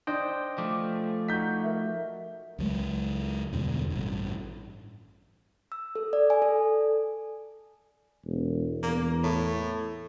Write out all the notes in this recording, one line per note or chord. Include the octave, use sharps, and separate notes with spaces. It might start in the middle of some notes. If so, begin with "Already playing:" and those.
D4 C5 D#5 G5
F3 A3 D6
D#4 F#4 G6 B6
A#4 E5
C#2 F#3 G#3
E2 G2 B2 D3
A1 G2
E6
A4
D5
G#5
A4
E1
E2 A#3
A2